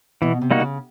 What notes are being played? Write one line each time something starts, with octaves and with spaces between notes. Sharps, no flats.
B2 E3
C3
G3 A#3 D#4 F#4
C#3